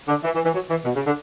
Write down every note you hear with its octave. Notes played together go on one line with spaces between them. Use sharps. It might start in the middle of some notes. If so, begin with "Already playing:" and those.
D3
E3
E3
E3
F#3
E3
B2
C#3
D3